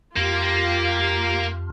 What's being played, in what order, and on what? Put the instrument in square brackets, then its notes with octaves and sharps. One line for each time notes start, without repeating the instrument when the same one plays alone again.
[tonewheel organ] F2 [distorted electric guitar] A#3 [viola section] F4 G4